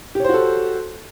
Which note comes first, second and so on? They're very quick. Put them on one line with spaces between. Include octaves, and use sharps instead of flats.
G4 C#5 C5 F#4 A4